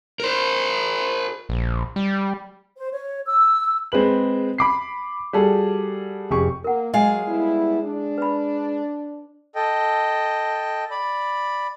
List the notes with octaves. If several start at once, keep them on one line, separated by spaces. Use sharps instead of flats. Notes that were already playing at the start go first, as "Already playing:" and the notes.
A#4 C5
A#1
G3
C5
C#5
E6
G#3 C4 G#4 B4 F#7
B5 D6 C7
G3 F#4 G#4 A4
F1 G4 G#4 C#6
A#3 A#4 F#5
F#3 G#3 G#4 D#5 F5 G#5
G3 B3 E4
D4
B4 B5
A4 D#5 G5
D5 B5